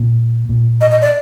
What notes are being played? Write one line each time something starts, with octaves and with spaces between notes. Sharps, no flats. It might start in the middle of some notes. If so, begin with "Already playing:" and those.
Already playing: A#2
A#2
D#5
D#5
D5